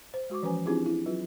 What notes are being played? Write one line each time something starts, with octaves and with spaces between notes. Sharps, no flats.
C5
G#3 F#4 C#6 D6
E3 F3 C#4 B4 C5 G#5
C4 D4 E4 F4 G4 G#4
E4
F#3 F4 B4